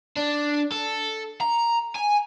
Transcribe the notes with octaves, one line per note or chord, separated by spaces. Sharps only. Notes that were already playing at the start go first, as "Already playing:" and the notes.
D4
A4
A#5
G#5